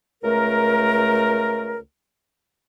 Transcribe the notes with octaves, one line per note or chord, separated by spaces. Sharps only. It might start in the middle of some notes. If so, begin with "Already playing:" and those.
C#2 A3 A#4